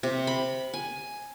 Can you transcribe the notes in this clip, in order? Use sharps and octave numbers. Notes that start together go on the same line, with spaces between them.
C3
B5
G#5